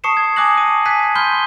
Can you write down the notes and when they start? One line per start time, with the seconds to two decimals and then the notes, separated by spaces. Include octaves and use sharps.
0.04 A5 C#6 D#6 C7 C#7 E7
0.17 G#6
0.36 G#5 D6 D#6 F#6 A#6 F#7
0.57 A5 D6 D#7
0.86 G#5 F#6 G#6 B6 D#7
1.15 B5 C6 F6 G6 D#7 G7